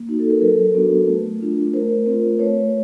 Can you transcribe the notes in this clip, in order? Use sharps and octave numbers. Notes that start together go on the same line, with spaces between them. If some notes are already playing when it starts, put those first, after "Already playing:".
Already playing: A#3
D#4 F#4
A4
A#4
F#3 A4 B4
B3 D4 F#4
A3
D4 F4
A3 A#4 C5
C4 F4
A3 B4 C#5